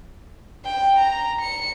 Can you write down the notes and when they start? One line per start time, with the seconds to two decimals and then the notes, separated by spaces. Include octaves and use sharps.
0.65 G5
0.99 A#5
1.41 C#7